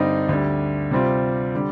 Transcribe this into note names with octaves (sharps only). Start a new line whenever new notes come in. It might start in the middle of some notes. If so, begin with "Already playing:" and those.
Already playing: G2 D3 G3 C4 D#4
D2 D3 G3
C3 G3 C4 F4
D3 G3